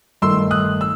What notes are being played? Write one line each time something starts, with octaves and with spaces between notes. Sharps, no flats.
G1 G2 D#3 A3 D#4 C6 E6
D#6 F#6
E6